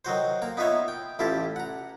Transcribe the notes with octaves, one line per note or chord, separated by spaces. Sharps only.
D#3 F#3 F#4 C5
A#3 A#5
B3 D#4 F4 B4 C#5 E5
G5
A1 E4 F4 G4 A5
F#5 A#5